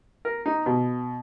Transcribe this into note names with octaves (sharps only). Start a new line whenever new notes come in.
A#4
D#4
B2